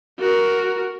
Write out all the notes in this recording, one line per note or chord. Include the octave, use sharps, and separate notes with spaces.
F#4 A#4